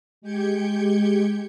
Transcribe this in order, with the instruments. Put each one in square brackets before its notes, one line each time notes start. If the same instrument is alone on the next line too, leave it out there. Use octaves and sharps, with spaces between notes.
[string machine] G#3 G4 G5 G6 G#6 C#7